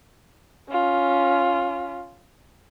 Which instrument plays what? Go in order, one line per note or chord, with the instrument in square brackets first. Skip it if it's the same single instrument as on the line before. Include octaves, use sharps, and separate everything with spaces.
[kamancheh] C#4 F4